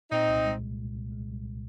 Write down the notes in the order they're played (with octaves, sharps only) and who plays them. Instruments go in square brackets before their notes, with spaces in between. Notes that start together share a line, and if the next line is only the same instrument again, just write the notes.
[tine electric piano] A#2 [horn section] C4 D#4
[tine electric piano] C2
G#3
C2
A#2
C2
G#3
C2